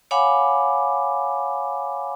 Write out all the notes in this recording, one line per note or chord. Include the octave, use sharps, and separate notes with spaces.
C#5 F5 F#5 G#5 B5 D6